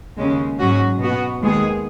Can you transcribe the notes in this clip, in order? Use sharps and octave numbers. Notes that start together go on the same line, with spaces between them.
D#2 C#3 G#3 C#4
G#2 F#3 C#4 F#4
B2 B3 F#4
D#2 D#3 G#3 B3 G#4